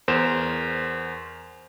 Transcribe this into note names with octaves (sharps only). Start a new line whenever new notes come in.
E2 A#4 C5 E7